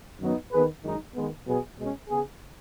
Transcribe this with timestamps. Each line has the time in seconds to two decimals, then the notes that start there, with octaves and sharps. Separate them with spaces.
0.20 F#2 D#3 F#3 B3 D#4
0.52 D#3 B3 G#4 B4
0.84 F#2 D#3 G#3 D#4
1.15 D#3 G#3 B3
1.46 B2 F#3 B3 G#4
1.78 B2 G#3 C#4
2.09 C#3 B3 G#4